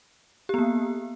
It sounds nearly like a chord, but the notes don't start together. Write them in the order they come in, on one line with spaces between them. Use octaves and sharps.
G4 B3 A#3